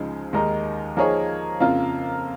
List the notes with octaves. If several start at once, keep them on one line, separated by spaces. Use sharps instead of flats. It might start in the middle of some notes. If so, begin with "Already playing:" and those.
Already playing: C#2 C#3 F3 G#3 D#4
D#2 D#3 G#3 D#4 A#4
F3 A#3 D#4 G#4 C#5
F2 C#3 A#3 F4